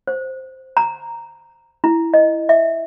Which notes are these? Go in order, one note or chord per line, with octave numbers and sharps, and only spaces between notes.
C5
A#5
E4
D#5
E5